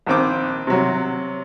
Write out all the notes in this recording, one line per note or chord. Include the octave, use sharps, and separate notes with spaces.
A#1 D#3 C4 D6
C3 F#3